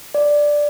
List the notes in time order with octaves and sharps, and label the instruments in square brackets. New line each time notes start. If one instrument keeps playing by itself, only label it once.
[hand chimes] D5